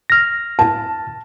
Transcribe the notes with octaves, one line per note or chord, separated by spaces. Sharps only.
F6 A#6
A5